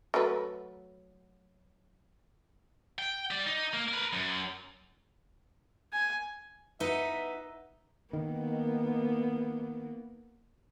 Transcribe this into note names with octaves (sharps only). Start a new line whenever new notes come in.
F#3 A3 B4
G5
G4 D5
D#4
A#3
A#4 B4
F#2
G#5
D#4 B4 E5 F#5
D#3 A#3 B3